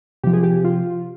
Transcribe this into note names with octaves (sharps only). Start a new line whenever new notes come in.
C3 F3 G4
G#4
G4
F4